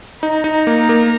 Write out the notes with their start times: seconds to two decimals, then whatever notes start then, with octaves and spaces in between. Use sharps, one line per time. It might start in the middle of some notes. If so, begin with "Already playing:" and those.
0.22 D#4 A#5
0.44 D#4
0.67 A#3
0.89 A#3